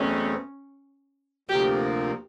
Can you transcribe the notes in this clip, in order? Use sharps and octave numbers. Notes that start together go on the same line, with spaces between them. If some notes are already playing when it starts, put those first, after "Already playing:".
Already playing: E2 B2 F#3 A3 C4 C#4
D2 C3 F3 A#3 G4